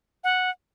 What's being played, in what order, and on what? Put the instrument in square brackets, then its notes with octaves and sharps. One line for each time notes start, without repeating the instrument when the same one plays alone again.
[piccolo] F#5